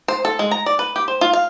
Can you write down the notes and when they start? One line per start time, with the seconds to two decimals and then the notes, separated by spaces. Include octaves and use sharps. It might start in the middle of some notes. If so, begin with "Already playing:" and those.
0.08 C5
0.25 A4
0.39 G#3
0.51 A#5
0.66 D5
0.79 B4
0.96 G4
1.08 C5
1.21 F4
1.33 F5